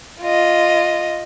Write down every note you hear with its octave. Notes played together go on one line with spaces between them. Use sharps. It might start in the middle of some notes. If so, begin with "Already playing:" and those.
F4 D#5